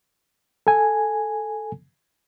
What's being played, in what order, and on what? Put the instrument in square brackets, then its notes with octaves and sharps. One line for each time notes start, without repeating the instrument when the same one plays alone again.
[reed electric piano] A4 G#5